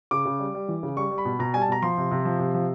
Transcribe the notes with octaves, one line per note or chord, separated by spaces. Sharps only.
C#3 D6
C#3
G3
G3
E3
C#3
G3 C#6
G3
B5
B2
B2 A#5
G3 G#5
A5
B2 A#5
F3 C6
C3
C3
F3
C3
F3